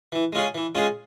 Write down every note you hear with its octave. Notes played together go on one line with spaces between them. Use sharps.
E3
G#3 C#4 F4 G#4
E3
G#3 C#4 F4 G#4